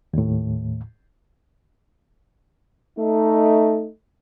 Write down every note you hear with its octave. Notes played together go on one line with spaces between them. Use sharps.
D#2 A2
A3 D#4